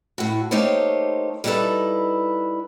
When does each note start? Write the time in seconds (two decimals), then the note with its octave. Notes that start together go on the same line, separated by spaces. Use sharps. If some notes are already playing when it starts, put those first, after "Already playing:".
0.18 A2 F#4
0.51 A3 A#3 D#4 G4 C5 C#5
1.44 G3 D#4 E4 F#4 A4 B4